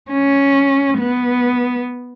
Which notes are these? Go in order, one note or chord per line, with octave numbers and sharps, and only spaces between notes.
C#4
B3